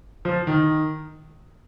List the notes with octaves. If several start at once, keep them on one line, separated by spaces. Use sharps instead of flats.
F3
D#3